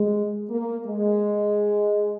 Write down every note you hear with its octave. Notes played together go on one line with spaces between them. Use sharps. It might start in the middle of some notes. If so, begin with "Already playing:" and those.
Already playing: G#3
A#3
G#3